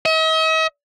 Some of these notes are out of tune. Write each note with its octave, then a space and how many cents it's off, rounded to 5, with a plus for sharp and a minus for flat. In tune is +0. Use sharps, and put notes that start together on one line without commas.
D#5 +45